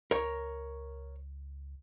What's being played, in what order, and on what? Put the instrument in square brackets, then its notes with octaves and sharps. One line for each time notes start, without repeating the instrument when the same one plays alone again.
[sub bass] C#2 [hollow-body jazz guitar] A#4 C#5